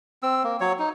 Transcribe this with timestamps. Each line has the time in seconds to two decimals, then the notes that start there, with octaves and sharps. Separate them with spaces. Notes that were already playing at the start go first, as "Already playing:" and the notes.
0.23 C4 E6
0.44 A#3
0.60 F#3 C#5
0.79 D#4